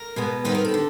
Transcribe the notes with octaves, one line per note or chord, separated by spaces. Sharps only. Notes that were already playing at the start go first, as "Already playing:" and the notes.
Already playing: A#4
B2 G#3 B3
C3 D#3 G3 B3 B4
A#4
A4
D3